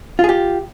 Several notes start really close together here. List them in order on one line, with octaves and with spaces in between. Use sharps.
F4 G#4 G4